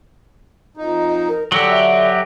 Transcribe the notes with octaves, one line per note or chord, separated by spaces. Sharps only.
F2 D#4
A#4
D3 F#3 F#4 G4 E6
E5